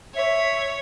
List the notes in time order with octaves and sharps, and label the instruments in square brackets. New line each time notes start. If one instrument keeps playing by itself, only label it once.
[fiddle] C#5 [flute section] E5